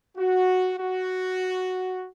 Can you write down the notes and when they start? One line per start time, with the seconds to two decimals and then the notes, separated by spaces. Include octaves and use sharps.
0.17 F#4
0.78 F#4